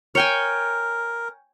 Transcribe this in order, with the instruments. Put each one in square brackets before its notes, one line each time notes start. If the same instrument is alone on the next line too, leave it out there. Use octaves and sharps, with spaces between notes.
[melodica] A#4 [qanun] C#5 G5 G#5